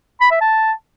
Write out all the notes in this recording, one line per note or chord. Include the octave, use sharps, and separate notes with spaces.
B5
E5
A5